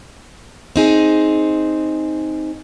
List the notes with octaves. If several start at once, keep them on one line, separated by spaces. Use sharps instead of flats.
C4 D#4 G#4